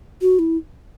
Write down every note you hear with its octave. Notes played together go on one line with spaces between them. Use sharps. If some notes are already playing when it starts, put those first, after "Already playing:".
F#4
E4